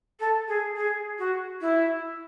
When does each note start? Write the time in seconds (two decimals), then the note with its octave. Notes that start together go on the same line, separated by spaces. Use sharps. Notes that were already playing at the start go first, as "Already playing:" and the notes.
0.20 A4
0.48 G#4
0.77 G#4
1.19 F#4
1.61 E4